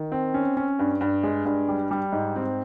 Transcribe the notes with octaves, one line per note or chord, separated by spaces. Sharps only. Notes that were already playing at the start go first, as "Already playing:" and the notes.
Already playing: D#3
C4
C#4
C#4
G2
G2
G#3
G2
G3
G3
G#2
C4